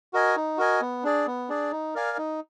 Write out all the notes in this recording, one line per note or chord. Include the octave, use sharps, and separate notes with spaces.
F#4 A#4 D#5 G#5
D#4
F#4 A#4 D#5 G#5
B3
D4 G#4 D5
B3
D4 G#4 D5
D#4
A#4 D5 F5 G#5
D#4